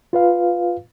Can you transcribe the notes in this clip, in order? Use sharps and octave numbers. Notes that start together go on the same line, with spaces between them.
F4 B4 F5